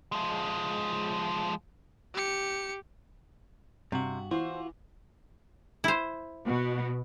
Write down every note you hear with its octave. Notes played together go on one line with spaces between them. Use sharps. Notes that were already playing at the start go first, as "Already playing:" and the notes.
F3 G#3
G4 C#7
G2 C3 F#4
E3 F4 F#4 C5
E4 C5
B2